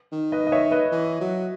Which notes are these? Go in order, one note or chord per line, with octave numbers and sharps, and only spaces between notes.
D#3
B4 D#5
D#5
C#5 E5
B4 D#5
E3
F#3